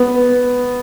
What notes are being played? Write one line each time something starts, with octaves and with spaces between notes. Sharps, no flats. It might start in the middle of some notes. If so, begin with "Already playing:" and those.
Already playing: B3